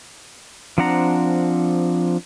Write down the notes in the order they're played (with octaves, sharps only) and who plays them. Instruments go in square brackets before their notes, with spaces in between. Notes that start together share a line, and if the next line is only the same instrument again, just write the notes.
[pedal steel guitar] F3 C4 D4 F#5 A#5